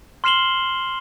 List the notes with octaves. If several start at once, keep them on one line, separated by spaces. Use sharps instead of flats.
C6 F6 C7 E7 F#7 G7